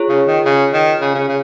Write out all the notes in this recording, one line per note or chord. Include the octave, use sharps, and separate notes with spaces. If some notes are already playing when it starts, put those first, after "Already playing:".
Already playing: F4 G#4 C#5
C#3
D#3
C#3
D#3
C#3
C#3
C#3